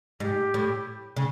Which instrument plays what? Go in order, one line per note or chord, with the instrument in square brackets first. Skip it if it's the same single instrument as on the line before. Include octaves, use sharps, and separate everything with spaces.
[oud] G#2 [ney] G4
[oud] A2
C#3